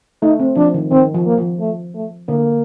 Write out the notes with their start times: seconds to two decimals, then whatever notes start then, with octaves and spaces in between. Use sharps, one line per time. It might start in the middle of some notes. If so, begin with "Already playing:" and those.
0.22 A3 D#4
0.40 C4
0.56 F3 D4
0.74 D#3
0.91 D#3 C4
1.14 F3
1.26 A#3
1.38 F3
1.60 A3
1.95 A3
2.28 D3 A#3